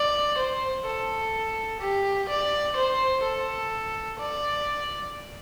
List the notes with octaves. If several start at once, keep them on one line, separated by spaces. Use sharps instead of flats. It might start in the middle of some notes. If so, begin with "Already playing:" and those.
Already playing: D5
C5
A4
G4
D5
C5
A4
D5